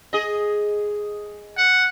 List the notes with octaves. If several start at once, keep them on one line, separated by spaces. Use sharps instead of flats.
G#4 D#5
F#5